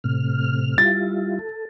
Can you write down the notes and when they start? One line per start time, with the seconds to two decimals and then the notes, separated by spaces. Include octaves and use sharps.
0.04 A2 C3 F6
0.78 G3 E4 F4 A6
1.39 A4